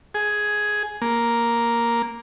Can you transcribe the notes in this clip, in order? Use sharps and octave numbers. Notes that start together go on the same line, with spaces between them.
G#4
A#3